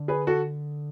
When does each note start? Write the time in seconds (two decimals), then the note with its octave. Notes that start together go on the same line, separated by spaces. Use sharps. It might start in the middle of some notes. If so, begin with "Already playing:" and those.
Already playing: D3
0.08 G#4 B4
0.27 F#4 A4